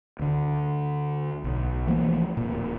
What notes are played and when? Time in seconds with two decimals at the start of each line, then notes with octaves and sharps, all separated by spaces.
0.19 D2 D3
1.44 B1
1.87 E3 F3 A3 A#3
2.37 D1 A#2